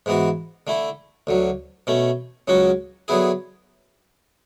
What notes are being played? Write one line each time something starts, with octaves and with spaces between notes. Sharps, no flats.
G#2 E3 B3 F#4
D3 A3 E4
D2 D3 F#3
B2 A3 C#4
C#2 C#3 F#3 C#4 F#4
D3 F#3 B3 E4 G#4